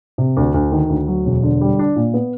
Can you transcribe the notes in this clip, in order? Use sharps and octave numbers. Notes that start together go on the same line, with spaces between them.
C3
D2
D2
D#3
D2
F#3
E1
D3
G3
D4
A#2
B3